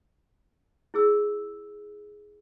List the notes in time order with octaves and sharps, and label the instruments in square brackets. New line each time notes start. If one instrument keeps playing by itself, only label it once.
[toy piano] E4 G#4 E6